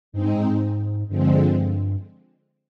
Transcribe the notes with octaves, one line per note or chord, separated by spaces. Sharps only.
G2 G#3 C4 D#4
G#2
G#2
G#2
G2 D3 F3 G#3 C4